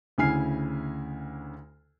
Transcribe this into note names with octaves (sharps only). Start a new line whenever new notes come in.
D2 C#3 E4 G#5 F6 C7